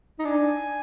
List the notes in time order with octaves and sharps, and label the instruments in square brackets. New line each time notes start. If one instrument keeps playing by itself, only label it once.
[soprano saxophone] D#4
[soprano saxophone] D4 [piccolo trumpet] G#5